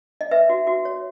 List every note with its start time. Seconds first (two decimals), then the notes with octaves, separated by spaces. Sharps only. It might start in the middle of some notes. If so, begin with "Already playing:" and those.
0.21 D#5
0.31 B4 E5
0.49 F#4
0.67 F#4
0.85 C#5